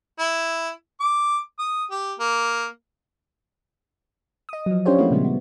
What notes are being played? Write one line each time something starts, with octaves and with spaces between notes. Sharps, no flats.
E4
D6
D#6
G4
A#3
D#5 D#6
F3 F#3
C#4 D4 F4 G4 C5 C#5
F3 A3 A#3 C4 E4 F#4
A#2 C#3 F3 G3 G#3 B3
B3